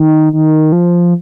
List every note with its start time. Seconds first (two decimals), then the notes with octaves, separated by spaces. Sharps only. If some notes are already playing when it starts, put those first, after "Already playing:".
Already playing: D#3
0.33 D#3
0.72 F3